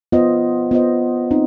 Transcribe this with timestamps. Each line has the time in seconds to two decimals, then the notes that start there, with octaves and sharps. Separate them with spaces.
0.12 B3 F4 C5 D#5
0.71 B3 F4 C5 D#5
1.31 C4 D#4